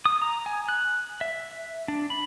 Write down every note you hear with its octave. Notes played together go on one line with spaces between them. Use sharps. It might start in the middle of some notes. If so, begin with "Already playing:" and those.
D#6
A#5
G#5
F#6
E5
D4
B5